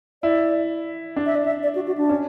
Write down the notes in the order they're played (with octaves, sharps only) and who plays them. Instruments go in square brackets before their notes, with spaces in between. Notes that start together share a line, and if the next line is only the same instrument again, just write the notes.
[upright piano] E4 [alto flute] D5
[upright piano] D4
[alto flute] E5
D5
E5
D5
F#4
F#4
D4
[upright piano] C#4